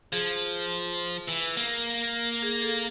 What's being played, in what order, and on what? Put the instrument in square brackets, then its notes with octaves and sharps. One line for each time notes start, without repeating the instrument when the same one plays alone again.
[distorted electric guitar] F3 [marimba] G#4
[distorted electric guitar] E3
A#3
[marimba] G#4
A4